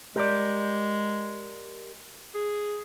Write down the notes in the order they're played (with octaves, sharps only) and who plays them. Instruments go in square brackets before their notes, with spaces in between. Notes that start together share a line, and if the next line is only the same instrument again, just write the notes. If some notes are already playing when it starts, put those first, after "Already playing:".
[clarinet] G#3 [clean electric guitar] G4 A#4 D5
[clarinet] G#4